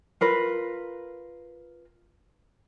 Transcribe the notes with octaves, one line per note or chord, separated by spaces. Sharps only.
F4 A#4 B4